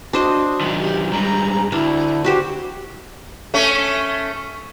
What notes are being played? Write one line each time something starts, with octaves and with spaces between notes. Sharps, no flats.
D4 F#4 C5 D#5
D#3 F#3
G4
G#2 G3 A#5
D2 D4 E4
F#4 G4 C5 F#5
A3 C#4